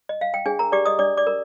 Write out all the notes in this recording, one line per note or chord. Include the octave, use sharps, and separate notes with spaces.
D#5
F5
G5
D4 G#4 G#5
A#4 A#5
G4 D5 D6
D#5 D#6
D4 D5 D6
D5 D6
A#4